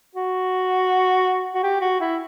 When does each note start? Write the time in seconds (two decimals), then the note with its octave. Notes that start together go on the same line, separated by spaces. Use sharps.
0.15 F#4
1.54 F#4
1.63 G4
1.81 F#4
2.01 E4